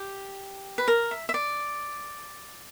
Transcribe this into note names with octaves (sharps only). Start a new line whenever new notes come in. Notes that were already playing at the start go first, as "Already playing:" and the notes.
Already playing: G4
B4
A#4
E5
E5
D5